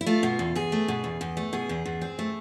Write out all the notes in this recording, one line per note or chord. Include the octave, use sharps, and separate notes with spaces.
E4
A3 F4
B2
E2
E2 G#4
A3
B2
E2
E2
A3
B2 G#4
E2
E2
C4
A3